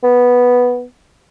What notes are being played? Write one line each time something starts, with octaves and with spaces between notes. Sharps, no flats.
B3